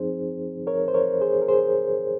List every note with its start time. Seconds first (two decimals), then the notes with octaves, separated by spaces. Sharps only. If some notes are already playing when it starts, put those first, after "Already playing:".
Already playing: F#2 F3 C4 D#4 G#4 C5
0.67 A#4 C#5
0.88 C5
0.94 A#4 C#5
1.21 G#4 C5
1.42 A#4
1.48 G#4 C5